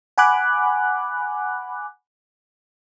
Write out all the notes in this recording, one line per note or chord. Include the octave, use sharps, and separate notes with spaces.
F#5 G#5 B5 D6 F#6